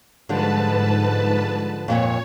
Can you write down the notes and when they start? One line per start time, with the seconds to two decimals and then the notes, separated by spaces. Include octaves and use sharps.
0.29 G#2 D3 F3 G3 B4 A5
1.88 F2 A#2 C#5